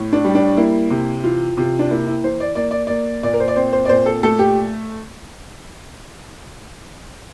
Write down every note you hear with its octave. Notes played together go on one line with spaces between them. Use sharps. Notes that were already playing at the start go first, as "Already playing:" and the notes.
Already playing: A2
D4
G3
D4
A#3 E4
C3
E3 F4
C3 F4
D4
A#3 E4
E4
E3 C5
D5
A#3 D5
D5
A#3 D5
A#2 D5
A#4
C5
D5
C4 C5
C5
D5
A#2 C5
A4
A3 A4
G4